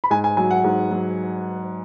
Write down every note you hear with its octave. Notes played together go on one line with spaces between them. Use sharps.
B5
G#2 G#5
G#5
F#3 G#5
F#5
G#2
F#3